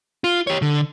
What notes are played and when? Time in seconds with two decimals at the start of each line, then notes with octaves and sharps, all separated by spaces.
0.24 F4
0.47 G4 C#5
0.62 D3